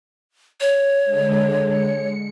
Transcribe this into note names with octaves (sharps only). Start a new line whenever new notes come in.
C#5
D3 G#3
C#7